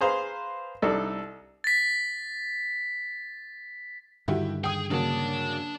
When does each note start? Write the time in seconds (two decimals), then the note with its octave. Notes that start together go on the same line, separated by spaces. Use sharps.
0.01 G#4 B4 C5 F5 A#5
0.82 C2 D4 D#4 A4
1.64 A6 B6
4.28 G2 D3 D#3 E4 F#4 G4
4.64 G#4 G5 D#6
4.91 C#3 F#3 A#3 D4 A5